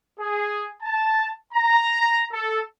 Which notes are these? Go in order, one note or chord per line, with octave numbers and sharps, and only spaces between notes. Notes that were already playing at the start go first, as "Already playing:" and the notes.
G#4
A5
A#5
A4